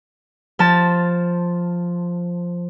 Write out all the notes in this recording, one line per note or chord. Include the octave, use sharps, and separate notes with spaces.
F3 A5